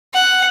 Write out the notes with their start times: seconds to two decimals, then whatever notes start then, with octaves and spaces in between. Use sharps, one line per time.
0.14 F#5